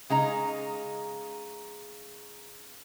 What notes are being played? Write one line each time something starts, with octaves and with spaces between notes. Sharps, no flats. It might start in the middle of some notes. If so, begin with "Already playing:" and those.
C#3 G#3 D#4 A#5